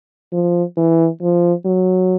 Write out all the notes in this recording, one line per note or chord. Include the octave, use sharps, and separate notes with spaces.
F3
E3
F3
F#3